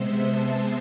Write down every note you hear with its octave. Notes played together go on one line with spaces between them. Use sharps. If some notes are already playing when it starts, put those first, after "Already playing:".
Already playing: C3 G#3 B3 C5 E5
A5